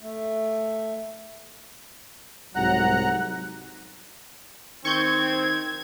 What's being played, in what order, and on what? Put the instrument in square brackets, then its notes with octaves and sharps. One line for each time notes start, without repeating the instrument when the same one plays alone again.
[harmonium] A3
[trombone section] C2 G#2 F#3 [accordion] F#5 A#5 F#6
[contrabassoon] D#3 [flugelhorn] C4 [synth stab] C#6 G6 [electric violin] G#6